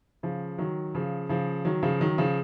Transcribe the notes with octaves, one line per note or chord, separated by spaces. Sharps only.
C#3 F3
D#3 F#3
C#3 F3
C#3 F3
D#3 F#3
C#3 F3
D#3 F#3
C#3 F3